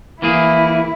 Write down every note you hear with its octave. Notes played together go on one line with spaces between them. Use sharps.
E3 A#3 E4 G#4